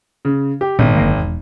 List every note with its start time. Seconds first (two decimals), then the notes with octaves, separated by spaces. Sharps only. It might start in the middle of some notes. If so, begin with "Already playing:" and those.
0.25 C#3
0.61 G4
0.79 G#1 A#2 B3 D4
0.96 F#1 D3 A#3
1.18 E1